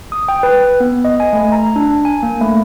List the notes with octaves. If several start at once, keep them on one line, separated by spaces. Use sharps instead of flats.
D#6
G5
B4
B3
D#5
G#5
A3
A#5
D4
G#5
A#3
A3